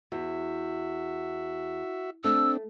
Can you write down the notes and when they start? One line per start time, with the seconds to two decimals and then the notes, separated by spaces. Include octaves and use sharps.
0.12 E2 F#4 E5
2.24 A3 C4 D4 E6